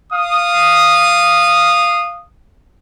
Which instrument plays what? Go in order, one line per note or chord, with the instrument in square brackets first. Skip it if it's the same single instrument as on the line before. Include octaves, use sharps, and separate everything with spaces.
[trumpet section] F5 D#6